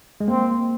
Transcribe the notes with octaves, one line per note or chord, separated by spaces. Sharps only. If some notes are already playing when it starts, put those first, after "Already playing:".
G#3
A#3 C4